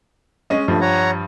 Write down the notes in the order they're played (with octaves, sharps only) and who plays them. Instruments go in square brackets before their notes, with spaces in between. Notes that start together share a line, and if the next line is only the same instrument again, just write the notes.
[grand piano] G#3 C#4 D#5
[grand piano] G2 F3 [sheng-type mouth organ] A3
[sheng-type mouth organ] C#5 F#5 A#5